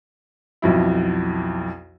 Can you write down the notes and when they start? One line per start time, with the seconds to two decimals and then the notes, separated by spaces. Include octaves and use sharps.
0.62 B1 F2 E4